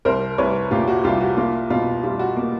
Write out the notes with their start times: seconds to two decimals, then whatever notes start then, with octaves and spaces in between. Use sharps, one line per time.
0.05 C2 A#4 C5
0.38 C2 B4 C#5
0.71 A#2 F4 G4
0.88 F#4
1.04 C2 F4 G4
1.21 F#4
1.37 A#3 F4
1.70 B2 F4
2.04 G3 F4
2.19 F#4
2.36 A#3